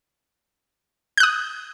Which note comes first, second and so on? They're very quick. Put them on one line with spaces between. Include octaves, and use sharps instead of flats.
G6 F#6 D#6